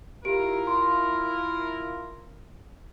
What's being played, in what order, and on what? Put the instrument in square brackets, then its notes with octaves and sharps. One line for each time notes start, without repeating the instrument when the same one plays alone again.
[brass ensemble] E4 F4 A#4 [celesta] G4 D7
[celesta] C6